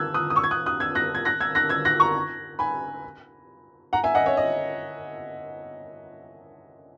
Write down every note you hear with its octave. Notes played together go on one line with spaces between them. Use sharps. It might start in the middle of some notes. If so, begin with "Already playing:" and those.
Already playing: E6 F#6 G#6
D#6 F#6
D#6
C#6 E6
G#6
D#6 F#6
D#6 F#6
E6 G#6
F#6 A#6
G#6
F#6 A#6
E6 G#6
F#6 A#6
E6 G#6
F#6 A#6
A#5 C#6
G#5 B5
F#5 A#5
E5 G#5
D#5 F#5
C#5 E5
D#5